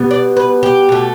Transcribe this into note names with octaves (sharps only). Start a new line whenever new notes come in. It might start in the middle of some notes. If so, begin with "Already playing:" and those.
Already playing: B2 G3 B3
D5
B4
G4
B2 A3